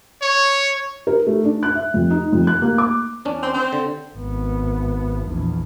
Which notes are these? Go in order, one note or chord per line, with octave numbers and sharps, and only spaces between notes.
C#5
A#4
A3
D4
F#6
E5
F2
D#4
F2
F#6
A#3
D6
E2 C#4 D4
C4
C4
D3
G#1 B3
A#1 E2